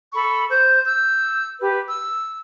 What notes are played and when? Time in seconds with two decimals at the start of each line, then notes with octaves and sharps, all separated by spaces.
0.14 A4 B5 C#6
0.50 C5 G6
0.85 E6 G6
1.60 G4 B4
1.87 E6